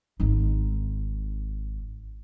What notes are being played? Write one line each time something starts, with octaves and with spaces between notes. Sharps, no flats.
G#1 D#4